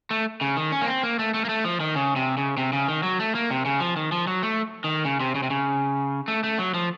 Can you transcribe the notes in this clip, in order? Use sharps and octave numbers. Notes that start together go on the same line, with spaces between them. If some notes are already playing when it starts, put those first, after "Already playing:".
A3
C#3
D#3
C#4
A#3
C4
A#3
A3
A3
A#3
A3
F3
D#3
C#3
C3
C#3
C3
C#3
D#3
F#3
A3
A#3
C3
C#3
F3
D#3
F3
F#3
A3
D#3
C#3
C3
C#3
C3
C#3
A3
A3
F#3
F3